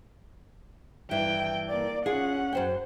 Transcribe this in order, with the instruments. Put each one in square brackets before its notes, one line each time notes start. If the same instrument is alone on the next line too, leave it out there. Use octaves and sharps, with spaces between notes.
[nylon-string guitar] G2 E3 G3 [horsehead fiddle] G5
[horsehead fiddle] A#3 D5
[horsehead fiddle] C#4 F#5 [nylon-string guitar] F4 G#4
[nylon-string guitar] F#2 C5 G5